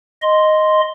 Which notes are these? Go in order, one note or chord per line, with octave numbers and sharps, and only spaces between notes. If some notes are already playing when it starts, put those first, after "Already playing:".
D#5 C6